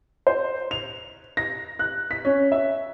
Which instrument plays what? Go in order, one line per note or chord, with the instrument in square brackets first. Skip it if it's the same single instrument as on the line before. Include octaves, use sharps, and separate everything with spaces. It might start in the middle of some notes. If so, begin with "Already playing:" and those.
[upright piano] C5
F7
A#6
F#6
B6
C#4
E5